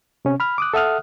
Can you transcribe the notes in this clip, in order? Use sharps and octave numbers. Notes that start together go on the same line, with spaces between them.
C3 C#4
B5 F6
D6 D#6 F#6
A4 E5 F#5 D#6 F6 F#6